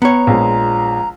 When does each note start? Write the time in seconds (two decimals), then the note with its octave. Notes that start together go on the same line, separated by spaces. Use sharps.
0.02 B3 C#5 A#5
0.27 A#1 F3 G#3